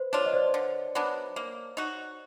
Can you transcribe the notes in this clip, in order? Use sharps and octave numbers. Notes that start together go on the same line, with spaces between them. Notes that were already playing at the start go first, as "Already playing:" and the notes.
Already playing: B4 C5
D4 F4 C#5
D#5
C5 D5
D3
F#3 B3 D4
A#3
D#4 F#4